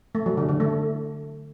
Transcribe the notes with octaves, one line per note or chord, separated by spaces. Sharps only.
A3
F#3
D3
D3
A3